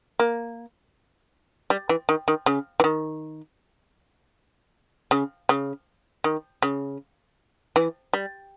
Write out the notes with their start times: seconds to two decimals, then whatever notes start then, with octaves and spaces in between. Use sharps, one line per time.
0.19 A#3
1.70 G3
1.89 E3
2.09 D#3
2.28 D#3
2.46 C#3
2.80 E3
2.84 D#3
5.11 C#3
5.49 C#3
6.24 D#3
6.62 C#3
7.76 E3
8.13 G3